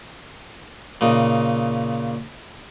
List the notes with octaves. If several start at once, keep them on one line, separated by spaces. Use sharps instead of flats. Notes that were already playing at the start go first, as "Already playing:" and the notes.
A#2 C#3 D#4